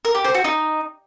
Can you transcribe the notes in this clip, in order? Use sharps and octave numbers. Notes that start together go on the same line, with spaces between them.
A#4
G4
C5
F#4
D#4